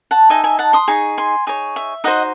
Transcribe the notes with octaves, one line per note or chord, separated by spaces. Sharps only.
F#5 A5
D#4 A4 D#5 E5 G#5
E5 G#5
F#5 A5
C6 D#6
D#4 G#4 C#6
G#5 C6
D#4 G#4 C#5
E5
D#4 F#4 C5 D#5 F#5